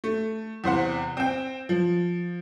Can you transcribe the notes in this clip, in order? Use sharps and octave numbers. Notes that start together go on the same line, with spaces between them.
A3
E2 C3 C5 F#5
C4 G5
F3